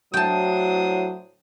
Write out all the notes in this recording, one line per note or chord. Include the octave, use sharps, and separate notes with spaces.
A2 F#3 D4 C5 G5 A5 D#6